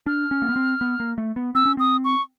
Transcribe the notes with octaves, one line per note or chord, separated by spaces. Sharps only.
D4 F6
C#4
A#3
B3
C4
B3
A#3
A3
B3
C4 E6
C#4
C4 D#6
C#6